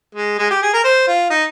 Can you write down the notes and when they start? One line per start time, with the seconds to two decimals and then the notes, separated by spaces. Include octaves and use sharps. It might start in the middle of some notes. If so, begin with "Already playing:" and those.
0.15 G#3
0.39 G#3
0.51 G4
0.62 G#4
0.73 A#4
0.84 C5
1.07 F4
1.30 D#4